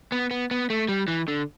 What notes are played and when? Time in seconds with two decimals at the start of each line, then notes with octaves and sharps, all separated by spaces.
0.12 B3
0.31 B3
0.51 B3
0.70 A3
0.89 G3
1.08 E3
1.28 D3